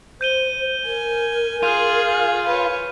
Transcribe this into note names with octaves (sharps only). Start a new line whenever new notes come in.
C5 G6 D#7 G7
A#4 G#5
F4 G#4 F6 G6 D#7
B4 C#5